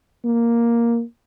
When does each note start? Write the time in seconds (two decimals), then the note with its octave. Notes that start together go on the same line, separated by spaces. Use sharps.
0.25 A#3